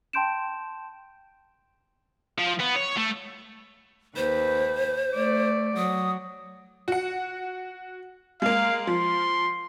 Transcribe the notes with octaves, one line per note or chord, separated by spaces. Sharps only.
G5 A5 C6 G6 D7 E7
F3
B3
C#5
A3
D#2 B4 C5
A3 D5
F#3 D#6
F#4 F#5
G#3 A#3 F5
F3 C6